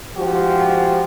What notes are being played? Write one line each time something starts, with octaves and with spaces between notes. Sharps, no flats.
G#2 F3 F#4 G4